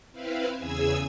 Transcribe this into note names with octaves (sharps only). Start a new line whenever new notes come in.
C4 E4 B4 F5
E2 C#3 G#4 G#5 E6 G#6